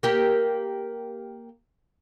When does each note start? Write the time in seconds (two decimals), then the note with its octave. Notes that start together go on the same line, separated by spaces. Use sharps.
0.03 A#3 G4 A#4